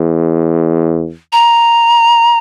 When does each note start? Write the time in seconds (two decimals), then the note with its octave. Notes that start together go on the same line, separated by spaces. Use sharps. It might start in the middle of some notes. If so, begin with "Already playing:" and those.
Already playing: E2
1.33 A#5